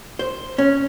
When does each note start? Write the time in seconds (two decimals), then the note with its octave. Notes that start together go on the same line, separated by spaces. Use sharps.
0.19 C5
0.58 C#4